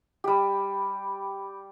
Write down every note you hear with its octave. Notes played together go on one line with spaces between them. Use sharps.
G3 G4